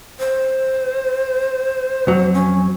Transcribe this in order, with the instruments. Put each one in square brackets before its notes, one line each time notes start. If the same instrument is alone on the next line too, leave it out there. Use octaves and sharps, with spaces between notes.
[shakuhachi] C5
[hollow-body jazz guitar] F2 F#3
[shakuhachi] C#4